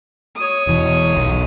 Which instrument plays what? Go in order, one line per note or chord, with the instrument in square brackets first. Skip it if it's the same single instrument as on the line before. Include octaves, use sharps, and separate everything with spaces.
[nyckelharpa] C#5 D#6
[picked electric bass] E1 E3
B1